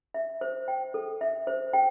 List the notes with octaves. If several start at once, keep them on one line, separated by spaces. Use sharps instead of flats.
E5
C5
G5
A4
E5
C5
G5